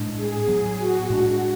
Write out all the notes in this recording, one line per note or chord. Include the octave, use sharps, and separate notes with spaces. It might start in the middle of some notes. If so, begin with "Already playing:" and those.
Already playing: A2 G#3 D4
G#4
A2 F#3 B3
F#4
A2 G#3 D4